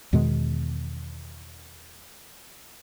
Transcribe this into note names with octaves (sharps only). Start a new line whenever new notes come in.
E2 B2 D#3 G#3